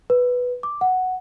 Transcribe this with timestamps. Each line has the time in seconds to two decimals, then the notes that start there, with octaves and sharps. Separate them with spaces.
0.10 B4
0.63 D6
0.81 F#5